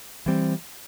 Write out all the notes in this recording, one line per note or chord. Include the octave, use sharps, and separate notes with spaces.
E3 G3 C4